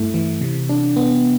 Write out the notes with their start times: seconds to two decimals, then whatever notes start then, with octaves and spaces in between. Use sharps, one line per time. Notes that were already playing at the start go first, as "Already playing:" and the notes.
Already playing: G2 A3 E4
0.14 E3
0.41 C3
0.69 D4
0.96 B3